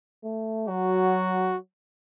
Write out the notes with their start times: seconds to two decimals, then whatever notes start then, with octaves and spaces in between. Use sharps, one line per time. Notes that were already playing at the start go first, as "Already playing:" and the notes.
0.24 A3
0.68 F#3 F#4